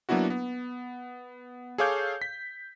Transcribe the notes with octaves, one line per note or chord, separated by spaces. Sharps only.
F#3 A#3 B3 D4 E4 F#4
B3
G#4 A4 C#5 F5 D6 G6
B6